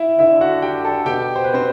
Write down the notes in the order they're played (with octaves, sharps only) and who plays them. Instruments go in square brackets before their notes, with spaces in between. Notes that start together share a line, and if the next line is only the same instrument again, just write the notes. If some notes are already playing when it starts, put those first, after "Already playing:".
Already playing: [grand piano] E4 E5
[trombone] D3 [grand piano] E4 E5
[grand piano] F#4 F#5
G4 G5
A4 A5
[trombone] B2 [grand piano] G4 G5
[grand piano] C5
B4
C4 C5